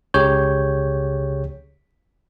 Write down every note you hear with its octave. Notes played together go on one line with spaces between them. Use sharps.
C#2 C#3 G4 G#4 C#5 G6